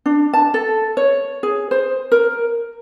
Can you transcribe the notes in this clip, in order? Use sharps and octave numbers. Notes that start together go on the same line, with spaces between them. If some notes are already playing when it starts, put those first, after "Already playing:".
D4
A5
A4
C#5
G#4
C5
A#4